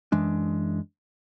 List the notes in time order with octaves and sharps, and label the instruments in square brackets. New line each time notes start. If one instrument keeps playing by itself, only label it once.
[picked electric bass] F#2 E3 G#3 D4